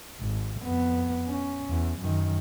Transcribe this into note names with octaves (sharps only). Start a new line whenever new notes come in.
G#1
F2 B3
C#4
E2
F#2 D#3